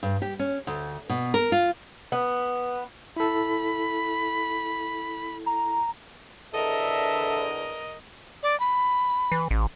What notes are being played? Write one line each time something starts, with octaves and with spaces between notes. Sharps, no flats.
G2
G4
C#4
D2
B2
A#4
F4
B3
E4 A4 B5
A#5
E2 D3 A4 A#4 D#5 E5
D5
B5
E3
A1